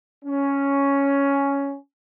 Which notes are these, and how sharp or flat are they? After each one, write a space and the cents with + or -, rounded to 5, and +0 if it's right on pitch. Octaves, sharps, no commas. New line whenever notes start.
C#4 +5